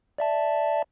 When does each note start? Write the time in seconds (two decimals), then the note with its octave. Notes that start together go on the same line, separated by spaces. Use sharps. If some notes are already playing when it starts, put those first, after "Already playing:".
0.18 D5 E5 A5